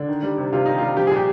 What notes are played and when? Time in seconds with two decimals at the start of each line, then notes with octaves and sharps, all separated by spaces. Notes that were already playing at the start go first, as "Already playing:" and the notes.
Already playing: D3 D4
0.08 D#3
0.23 G3
0.38 C3
0.53 C3 F4
0.66 D#3 D#4
0.78 G3 F4
0.97 F3 G4
1.07 A#2 G#4
1.16 G4